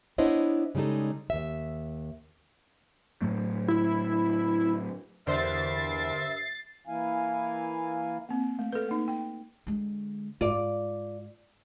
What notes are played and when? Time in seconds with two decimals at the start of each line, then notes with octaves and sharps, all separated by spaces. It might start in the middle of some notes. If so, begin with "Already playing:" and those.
0.18 B3 D4 E4 C5 C#5 D#5
0.75 C#3 G3 G#3 D#4 A4
1.30 D#2 E5
3.22 A2 F#3 A3
3.68 E4
5.27 E2 G2 D3 A#4 C5 E5 A6 C7
6.87 E3 A#3 E4 F5 G#5
8.29 A#3 C4
8.59 A3
8.73 A4 B4
8.88 A#3 D#4
9.08 G5
9.67 D3 G#3
10.41 G#2 F4 D5